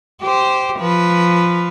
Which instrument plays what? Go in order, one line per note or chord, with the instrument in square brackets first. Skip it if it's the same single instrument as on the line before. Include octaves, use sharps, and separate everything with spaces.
[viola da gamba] G4 C5
F3 B4